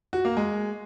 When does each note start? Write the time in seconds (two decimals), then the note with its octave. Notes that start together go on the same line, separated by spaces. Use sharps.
0.13 F#4
0.25 A#3
0.37 G#3